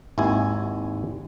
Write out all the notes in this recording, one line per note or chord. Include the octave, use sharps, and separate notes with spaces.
G#1 D#2 E4 G#5